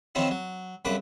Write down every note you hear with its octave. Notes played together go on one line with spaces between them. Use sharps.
D#3 F3 F#3 C4 D#4 E4
F#3
C2 F#2 C#3 B4 D6